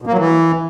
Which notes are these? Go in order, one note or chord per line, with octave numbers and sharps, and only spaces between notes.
B2
A#3
F#3
E3